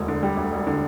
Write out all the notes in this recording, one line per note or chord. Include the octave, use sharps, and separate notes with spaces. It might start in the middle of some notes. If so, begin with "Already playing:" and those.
Already playing: E1 D2
D3
G3
D2
E1
D3